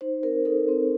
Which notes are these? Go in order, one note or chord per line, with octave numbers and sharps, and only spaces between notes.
D#4 C5
C4 A#4
D#4 A4
C4